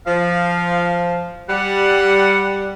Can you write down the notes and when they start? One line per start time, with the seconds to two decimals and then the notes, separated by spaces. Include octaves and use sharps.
0.06 F3 F5
1.49 G3 F#5